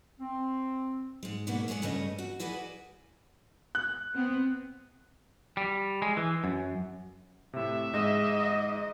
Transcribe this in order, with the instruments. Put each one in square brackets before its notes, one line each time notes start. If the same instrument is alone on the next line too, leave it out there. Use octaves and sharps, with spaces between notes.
[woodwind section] C4
[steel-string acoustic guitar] G#2 G#3
G#2 B2 A#3 B3 D4 F#4
G#3 A3 G#4 C5 F#5
G2 C#3 A3 C#4 C#5 D#5
F#4
E4 F#4 G#4 B4 D5 D#5
[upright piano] F#6
[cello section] B3 C4
[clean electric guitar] G3
G#3
E3
F#2
[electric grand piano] A2 C3 [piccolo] E5
[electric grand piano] G#2 G#3 [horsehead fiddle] D#5